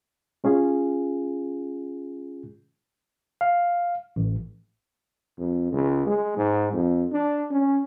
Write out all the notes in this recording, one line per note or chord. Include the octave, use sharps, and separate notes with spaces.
G#3 C#4 F4 G#4
F5
A1
F2
C#2
G#3
G#2
F2
D4
C#4